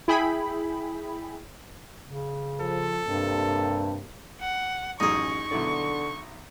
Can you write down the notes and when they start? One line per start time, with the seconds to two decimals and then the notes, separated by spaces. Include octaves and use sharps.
0.08 E4 G#4 G5 B5
2.05 C#3
2.61 F3 A4
3.06 G2 C3 G3 A#3
4.41 F#5
5.00 A1 F#2 D#4 G#4 A#5 C#6
5.51 B1 D3 E4 D5